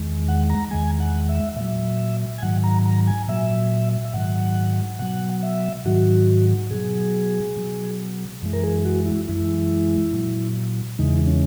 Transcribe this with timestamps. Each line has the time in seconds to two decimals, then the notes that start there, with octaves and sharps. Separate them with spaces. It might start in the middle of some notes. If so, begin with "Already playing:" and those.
Already playing: E2 D#3 G#3
0.28 F#5
0.50 A#5
0.71 E2 D#3 G#3 G#5
1.00 F#5
1.29 E5
1.57 A#2 F#3 E5
2.38 G#5
2.42 G#2 D#3 F#3 F#5
2.64 A#5
2.85 A#5
3.07 G#5
3.28 A#2 F#3 E5
4.05 E5
4.13 G#2 D#3 F#3 F#5
4.99 B2 F#3 F#5
5.43 E5
5.85 G#2 D#3 F#3 F#4
6.71 B2 F#3 G#4
7.56 B2 F#3
8.42 F#2 E3 G#3
8.53 A#4
8.63 G#4
8.85 F#4
9.06 E4
9.28 F#2 E3 G#3 E4
10.13 A#2 F#3
10.99 E2 C#3 E3 G#3 D#4
11.27 C#4